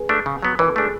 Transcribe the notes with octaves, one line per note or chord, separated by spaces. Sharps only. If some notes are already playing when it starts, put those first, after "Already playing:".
Already playing: G#4 B4
A3 D4
C#3
F#3 B3
E3 B4
A4
A3 D4 G#4